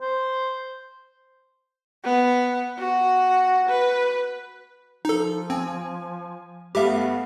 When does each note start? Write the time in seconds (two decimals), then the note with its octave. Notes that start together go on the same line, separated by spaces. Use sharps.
0.01 C5
2.04 B3
2.79 F#4
3.69 B4
5.05 F3 D#4 A4
5.50 C4 G#5
6.75 G2 A3 B3 G4 E5 F5